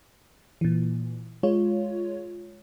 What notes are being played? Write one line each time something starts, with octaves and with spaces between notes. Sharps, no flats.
A#2 E3
G#3 F4 C#5